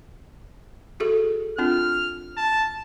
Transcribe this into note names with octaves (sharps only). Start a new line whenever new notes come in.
F#4 G#4 A4
C4 D4 F4 F6
A5